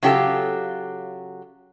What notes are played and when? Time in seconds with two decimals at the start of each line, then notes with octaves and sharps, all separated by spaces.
0.03 C#3 F#3 F4 G4 A4